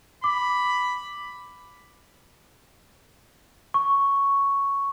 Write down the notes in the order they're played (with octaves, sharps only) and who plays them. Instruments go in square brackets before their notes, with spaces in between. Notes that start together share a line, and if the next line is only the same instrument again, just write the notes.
[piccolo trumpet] B5 [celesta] D6
[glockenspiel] C#6